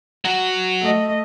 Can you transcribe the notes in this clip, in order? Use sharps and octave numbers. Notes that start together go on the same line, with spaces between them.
F#3 F#4
A3 D#5